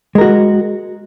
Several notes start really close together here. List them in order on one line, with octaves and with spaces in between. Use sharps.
G#3 A#4 F#4